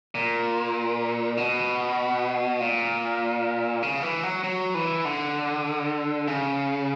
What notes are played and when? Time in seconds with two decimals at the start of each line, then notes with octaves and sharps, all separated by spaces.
0.15 A#2
1.37 B2
2.61 A#2
3.83 C#3
4.03 E3
4.23 F#3
4.44 F#3
4.75 E3
5.05 D3
6.28 C#3